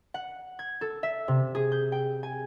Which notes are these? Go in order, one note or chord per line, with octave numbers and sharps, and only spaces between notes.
F#5
G#6
A4
E5
C3
G#4
G6
G5
G#5